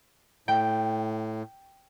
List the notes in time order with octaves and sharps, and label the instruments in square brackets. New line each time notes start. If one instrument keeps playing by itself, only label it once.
[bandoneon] A2 [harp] G5